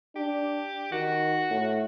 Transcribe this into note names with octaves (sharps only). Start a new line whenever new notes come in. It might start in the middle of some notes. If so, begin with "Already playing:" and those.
D4 G4
D#3 F#4
A2